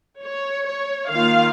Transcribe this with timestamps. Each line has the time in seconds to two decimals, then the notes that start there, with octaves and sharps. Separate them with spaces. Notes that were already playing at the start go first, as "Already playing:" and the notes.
0.23 C#5
0.66 C#5
1.10 D#3 A#3 F4 F5